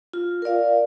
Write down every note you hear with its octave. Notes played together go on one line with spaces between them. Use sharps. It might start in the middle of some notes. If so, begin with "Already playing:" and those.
F4
A#4 D5 F5